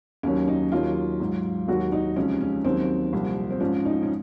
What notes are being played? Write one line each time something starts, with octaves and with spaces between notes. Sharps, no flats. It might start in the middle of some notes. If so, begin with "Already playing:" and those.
D#2 D#3 F#3 C#4
D#4
D#2 D#3 F#3 F4
G#2 F#3
D#2 D#3 F#3 F#4
D#4
C#2 C3 F3 C#4
C#4
D#2 D#3 F#3 C4
C2 A#2 F3
C4
G#2 F3 C#4
D#4
C#4